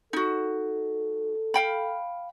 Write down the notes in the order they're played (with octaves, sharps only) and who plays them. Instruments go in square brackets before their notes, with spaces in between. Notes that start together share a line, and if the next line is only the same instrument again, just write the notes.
[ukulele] D#4 F#4 [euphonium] A4
[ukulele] F5 G5 B5